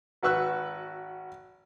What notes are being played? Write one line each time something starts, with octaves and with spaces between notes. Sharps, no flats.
G#1 F#4 B4 C#6 E6 F#6